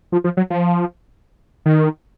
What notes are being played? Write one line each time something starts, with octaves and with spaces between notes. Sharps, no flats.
F3
F3
F#3
F3
D#3